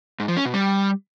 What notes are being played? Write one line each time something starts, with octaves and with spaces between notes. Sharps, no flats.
G#2
F3
C#4
B2
G3